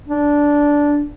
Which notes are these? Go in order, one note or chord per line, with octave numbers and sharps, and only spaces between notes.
D4